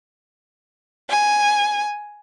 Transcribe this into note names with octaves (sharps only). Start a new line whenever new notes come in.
G#5